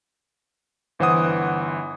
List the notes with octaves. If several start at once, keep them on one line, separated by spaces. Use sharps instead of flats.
G1 E3 C5 F#5 D#6